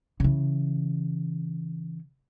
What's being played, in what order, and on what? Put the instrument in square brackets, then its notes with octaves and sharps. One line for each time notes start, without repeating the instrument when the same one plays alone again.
[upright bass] C#3 E3